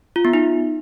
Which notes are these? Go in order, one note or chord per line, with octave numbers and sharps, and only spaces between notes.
F4
B3
D#4